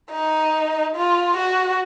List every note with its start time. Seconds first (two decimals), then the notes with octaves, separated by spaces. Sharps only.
0.12 D#4
0.96 F4
1.37 F#4